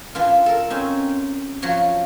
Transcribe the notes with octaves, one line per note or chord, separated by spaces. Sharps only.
E3 D4 F4
A4 A#4
C4 C#4 D#4
F3 F#3 F#4 C#5